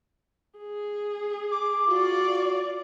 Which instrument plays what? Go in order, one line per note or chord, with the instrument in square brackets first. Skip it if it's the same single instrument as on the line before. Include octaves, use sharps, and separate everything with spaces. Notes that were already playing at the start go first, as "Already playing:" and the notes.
[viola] G#4
[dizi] D6
[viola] F4 D5 [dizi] F#4